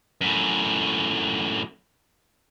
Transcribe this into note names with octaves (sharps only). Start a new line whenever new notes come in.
F#2 A2